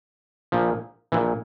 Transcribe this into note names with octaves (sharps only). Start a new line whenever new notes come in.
A#1 A#2 F3
A#1 A#2 E3